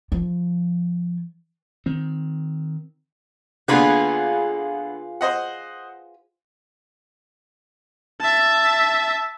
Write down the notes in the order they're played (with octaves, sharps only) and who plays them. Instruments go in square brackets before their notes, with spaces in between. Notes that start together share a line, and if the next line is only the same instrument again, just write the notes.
[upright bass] F3
[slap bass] D#3 C4
[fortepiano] D3 A#3 B3 [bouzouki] F4 G#4 B4
[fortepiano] C5 D#5 F#5
[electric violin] E5 A5